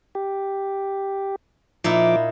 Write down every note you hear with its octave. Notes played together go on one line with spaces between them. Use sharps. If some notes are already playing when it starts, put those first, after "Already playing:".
G4
A#2 F3 D#4 E4 D6